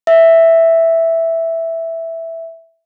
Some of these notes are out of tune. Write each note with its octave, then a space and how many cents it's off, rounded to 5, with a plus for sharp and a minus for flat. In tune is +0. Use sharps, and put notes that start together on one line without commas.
E5 +0